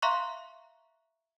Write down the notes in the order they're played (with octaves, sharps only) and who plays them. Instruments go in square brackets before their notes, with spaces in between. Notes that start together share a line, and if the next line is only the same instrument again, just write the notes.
[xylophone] E5 F5 A#5 C6 C#6 F#6